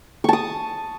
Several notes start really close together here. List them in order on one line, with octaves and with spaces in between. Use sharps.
C#6 A5 D#6